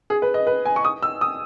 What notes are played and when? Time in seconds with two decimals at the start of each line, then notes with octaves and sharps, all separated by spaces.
0.10 G#4
0.22 B4
0.34 D#5
0.47 B4
0.65 G#5
0.76 C#6
0.85 D#6
1.03 E6
1.21 D#6